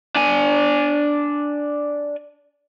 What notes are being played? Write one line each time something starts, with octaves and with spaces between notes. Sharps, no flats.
D4 G#5